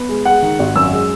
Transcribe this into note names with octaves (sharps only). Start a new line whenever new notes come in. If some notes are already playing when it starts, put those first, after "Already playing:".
Already playing: B3
G#3
G#3 F#5
D#3
G#1
F#2 E6
G#3